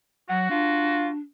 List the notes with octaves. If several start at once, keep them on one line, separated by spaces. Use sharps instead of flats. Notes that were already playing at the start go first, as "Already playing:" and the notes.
F#3 F#4 F#5
D4 F4